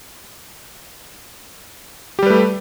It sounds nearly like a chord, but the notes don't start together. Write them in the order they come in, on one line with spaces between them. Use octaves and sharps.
G4 G3 B4 A3